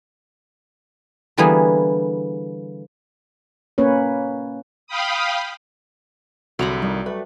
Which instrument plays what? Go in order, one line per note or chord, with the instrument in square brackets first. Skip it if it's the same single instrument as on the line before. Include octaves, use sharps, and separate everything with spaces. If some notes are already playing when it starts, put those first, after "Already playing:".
[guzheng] D3 E3 G3 A#3 B3 G#4
[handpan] A#3 C#4 B4 C#5
[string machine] F5 G5 B5 D#6
[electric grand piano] C2 [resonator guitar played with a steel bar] D3 [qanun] F#3 A#5 B5
[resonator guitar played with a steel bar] D#3 [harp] G3
[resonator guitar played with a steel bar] A3 [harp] B4